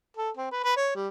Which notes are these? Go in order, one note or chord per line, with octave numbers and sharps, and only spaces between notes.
A4
C4
B4
B4
C#5
G3